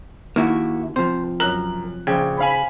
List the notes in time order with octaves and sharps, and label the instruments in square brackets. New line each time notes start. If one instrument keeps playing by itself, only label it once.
[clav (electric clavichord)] D#2 [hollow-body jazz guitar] A#3 E4 F#4
[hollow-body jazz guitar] C3 F3 [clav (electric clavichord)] C5
[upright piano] F#2 F#6 F#7 [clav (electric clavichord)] A#4
[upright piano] A#1 G5 G#6 [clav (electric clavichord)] C#3
[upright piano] C5 F5 G#5 [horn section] B5